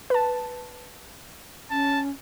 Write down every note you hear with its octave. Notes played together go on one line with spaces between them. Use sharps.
B4 A5
C#4 A5